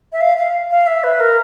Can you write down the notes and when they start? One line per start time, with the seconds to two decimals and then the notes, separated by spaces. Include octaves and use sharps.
0.13 E5
0.21 F5
0.37 F5
0.71 F5
0.87 E5
1.04 B4
1.20 A#4